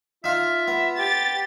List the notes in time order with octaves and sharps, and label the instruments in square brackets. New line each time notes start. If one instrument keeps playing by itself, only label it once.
[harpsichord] D#4 F5 [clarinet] F4 [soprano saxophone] E5
[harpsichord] B3
[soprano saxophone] G4 [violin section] A6